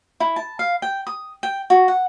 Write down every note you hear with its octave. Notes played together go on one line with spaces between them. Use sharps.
E4
A5
F5
G5
D#6
G5
F#4
F#5